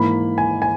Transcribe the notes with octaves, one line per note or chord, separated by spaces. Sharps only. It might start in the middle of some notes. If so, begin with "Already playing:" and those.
Already playing: G#2 E3 A#3 B5
G#5
G#5